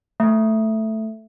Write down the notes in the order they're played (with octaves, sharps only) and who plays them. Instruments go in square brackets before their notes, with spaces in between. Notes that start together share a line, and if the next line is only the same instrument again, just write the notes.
[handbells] A3